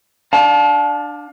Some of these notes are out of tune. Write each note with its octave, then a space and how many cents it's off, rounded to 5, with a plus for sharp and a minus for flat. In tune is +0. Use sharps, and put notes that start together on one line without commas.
D4 +10 F5 +30 A5 -30